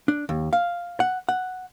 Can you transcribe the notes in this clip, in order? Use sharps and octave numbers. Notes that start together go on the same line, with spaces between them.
D4
D#2
F5
F#5
F#5